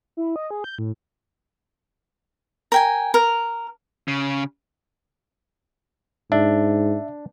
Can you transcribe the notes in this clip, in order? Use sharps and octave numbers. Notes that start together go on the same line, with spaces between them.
E4
D#5
G#4
G6
A2
A#4 G5 G#5
A#4
C#3
G#2 D4 E5